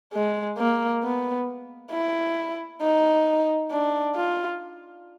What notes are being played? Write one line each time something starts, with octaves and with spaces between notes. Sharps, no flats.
G#3
A#3
B3
E4
D#4
D4
F4